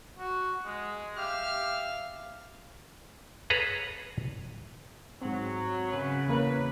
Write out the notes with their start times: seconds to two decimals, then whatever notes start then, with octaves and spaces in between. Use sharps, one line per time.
0.18 F#4
0.65 G#3
1.17 G4 E5 F5 F6
3.50 G#4 A4 B4 C#5 A#5
5.22 G#2 F#3 C4
5.91 F#2 C#3 B4
6.28 E2 A#3 B4